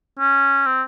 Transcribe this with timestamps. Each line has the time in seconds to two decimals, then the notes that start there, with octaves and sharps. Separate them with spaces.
0.19 C#4
0.66 C4